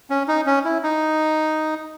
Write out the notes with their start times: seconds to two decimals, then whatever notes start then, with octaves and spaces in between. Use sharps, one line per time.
0.10 C#4
0.28 D#4
0.46 C#4
0.65 E4
0.83 D#4